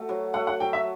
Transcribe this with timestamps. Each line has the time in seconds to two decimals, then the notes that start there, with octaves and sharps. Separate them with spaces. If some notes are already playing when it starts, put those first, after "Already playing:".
Already playing: A3 F#4
0.09 F#3
0.34 A3 F#5
0.47 F#5
0.60 F#3 G5
0.73 E5